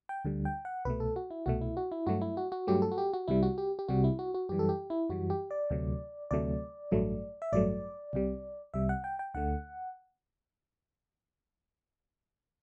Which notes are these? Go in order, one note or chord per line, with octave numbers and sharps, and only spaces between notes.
G5
D2 D3 G3
G5
F#5
C2 B2 A3 B4
A4
F#4
E4
C2 B2 A3 F#4
E4
F#4
E4
G2 F#3 A3 F#4
E4
F#4
F#4
G2 F#3 A3 G4
A4
F#4
G4
F#4
C2 C3 G3 E4
F#4
G4
G4
C2 C3 G3 F#4
E4
F#4
F#4
F#2 E3 G3 G4
A4
G4
E4
F#2 E3 G3 F#4
G4
D5
D2 C3 F#3 A3
D2 C3 F#3 A3 D5
A1 G2 F#3 A3
E5
A1 G2 F#3 A3 D5
C2 C3 G3
C2 C3 G3 E5
F#5
G5
G5
D2 D3 A3 F#5